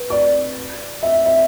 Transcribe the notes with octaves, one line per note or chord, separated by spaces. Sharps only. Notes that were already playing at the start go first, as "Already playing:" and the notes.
Already playing: B4
D5
E5
E5